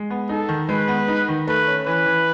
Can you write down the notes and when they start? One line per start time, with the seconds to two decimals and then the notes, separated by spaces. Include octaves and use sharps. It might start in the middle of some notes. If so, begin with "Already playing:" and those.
Already playing: G#3
0.10 B3
0.29 D#4 A4
0.49 D#3
0.69 G#3 B4
0.88 B3
1.08 D#4
1.28 D#3
1.47 A3 B4
1.67 C#4
1.86 E3 B4
2.06 E3